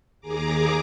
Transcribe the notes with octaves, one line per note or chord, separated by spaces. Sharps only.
D#2 G#4 A#5 D6